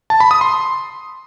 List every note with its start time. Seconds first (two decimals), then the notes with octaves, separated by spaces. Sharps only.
0.10 A5
0.20 B5
0.31 D#6
0.41 C6